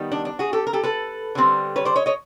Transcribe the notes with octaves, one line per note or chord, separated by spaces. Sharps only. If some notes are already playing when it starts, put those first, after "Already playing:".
Already playing: D#3 G3 B3
D4
D4
F#4 G#4
G4 A4
A#4
G4 A4
A4 B4
D3 G3 C4
B4 C#5
C5 D5
C#5 D#5
C#5 D#5